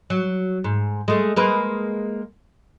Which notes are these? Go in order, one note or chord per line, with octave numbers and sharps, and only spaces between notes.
F#3
G#2
G#3 A3
G#3 A#3 B4